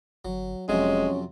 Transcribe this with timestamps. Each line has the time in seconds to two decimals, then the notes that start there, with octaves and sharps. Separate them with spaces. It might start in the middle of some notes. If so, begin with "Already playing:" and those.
0.25 G1 F#3
0.69 F1 F2 C3 F#3 G#3 C#4